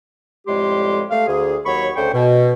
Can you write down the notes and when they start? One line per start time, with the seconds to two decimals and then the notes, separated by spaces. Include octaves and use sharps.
0.47 F2 A2 G3 G#3 G4 C6
1.10 A3 F5
1.27 D2 G#4
1.66 D#2 F#3 F#4 C#5 B5 C#6
1.96 D2 C#3 A4 C5 G5 C#6
2.13 B2